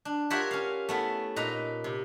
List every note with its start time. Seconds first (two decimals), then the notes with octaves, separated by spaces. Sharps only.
0.05 D4
0.30 F4 G4 A#4 C#5 E5 F#5
0.51 C#4 F5
0.89 A3 B3 E4
1.36 A#2 D#4 B4 A#5
1.84 C3